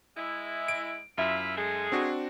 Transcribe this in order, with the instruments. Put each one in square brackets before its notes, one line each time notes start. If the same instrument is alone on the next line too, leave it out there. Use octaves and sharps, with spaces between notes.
[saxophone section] G#3 E4
[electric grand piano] D7
[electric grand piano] F#2 [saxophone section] E4 F4 E5
[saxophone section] G#3 A3 G#4
[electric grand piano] C4 D4 F#4